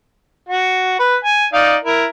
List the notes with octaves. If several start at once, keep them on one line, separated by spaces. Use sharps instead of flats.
F#4
B4
G#5
D#4 D5 F5
E4 A#4